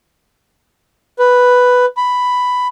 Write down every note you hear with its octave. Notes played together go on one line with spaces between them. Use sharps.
B4
B5